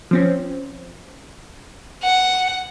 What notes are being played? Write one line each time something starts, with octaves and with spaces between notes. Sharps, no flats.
F3 C4 C#4
F#5